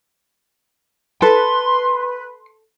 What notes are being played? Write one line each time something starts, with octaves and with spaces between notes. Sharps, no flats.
A4 B4 C6